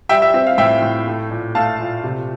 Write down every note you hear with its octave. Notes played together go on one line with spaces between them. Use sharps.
G3 E5 G5
E5
C4 E5
F5
A2 E5 G5
A2
A3
A#2
A3 F5 A5
A#2
C3